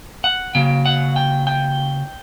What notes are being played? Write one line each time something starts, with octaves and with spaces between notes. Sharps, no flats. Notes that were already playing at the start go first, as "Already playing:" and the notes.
F#5
C#3 F#3 A#3 G5
F#5
G5
G5